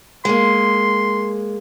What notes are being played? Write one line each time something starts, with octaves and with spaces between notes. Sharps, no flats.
G#3 A#3 C6